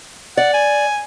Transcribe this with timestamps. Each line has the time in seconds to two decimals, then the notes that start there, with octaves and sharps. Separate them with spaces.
0.37 D5 F#5
0.54 G#5